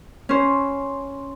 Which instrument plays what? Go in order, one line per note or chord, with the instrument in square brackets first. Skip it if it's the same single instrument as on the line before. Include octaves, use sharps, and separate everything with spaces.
[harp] C#4 C5